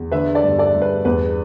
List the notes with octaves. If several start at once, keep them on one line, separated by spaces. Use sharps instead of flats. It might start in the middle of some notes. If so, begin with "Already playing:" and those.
Already playing: E2
D3 B4 E5
A4 D5
G2
A4 D5
G2
B4
E2 B4